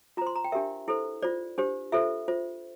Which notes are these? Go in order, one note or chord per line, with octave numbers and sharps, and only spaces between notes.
F4 C5 A#5
C6
A#5
G5
D4 G4 A#4 E5
E4 A4 C5
F4 C5 D5
D4 G4 C5
F4 A4 C5 E5
F4 C5